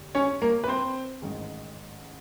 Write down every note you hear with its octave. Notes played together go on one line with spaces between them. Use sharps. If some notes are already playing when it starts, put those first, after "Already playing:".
Already playing: F1 D#2 D3
C#4 C#5
A#3 A#4
B4
C4 C5
A1 G#2 D#3 G#3